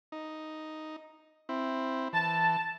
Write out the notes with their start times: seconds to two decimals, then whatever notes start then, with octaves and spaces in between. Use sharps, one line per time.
0.12 D#4
1.49 C4 E4
2.13 E3 A5